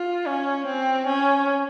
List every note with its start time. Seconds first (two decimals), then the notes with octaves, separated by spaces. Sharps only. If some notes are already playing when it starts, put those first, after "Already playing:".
Already playing: F4
0.26 C#4
0.67 C4
1.07 C#4